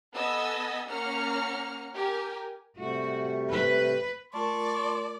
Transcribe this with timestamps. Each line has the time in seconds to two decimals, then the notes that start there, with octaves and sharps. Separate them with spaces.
0.13 B3 A4 D#5 G#5 E6
0.88 A#3 C#4 F#5 A#5 F6 C#7
1.95 G4 A#4 G#5
2.77 C3 G3 A3 F#4
3.51 B4
4.33 A3 F4 A#4 D5 A5 C6 C#6